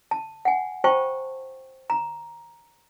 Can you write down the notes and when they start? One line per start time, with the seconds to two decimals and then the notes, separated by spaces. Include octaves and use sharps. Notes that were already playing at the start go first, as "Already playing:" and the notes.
0.11 A5
0.45 F#5 G#5
0.84 F4 C5 G5 A5 C#6
1.90 A#5